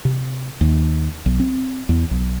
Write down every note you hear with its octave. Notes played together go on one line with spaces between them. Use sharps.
C3
D#2
B1
C4
E2
B1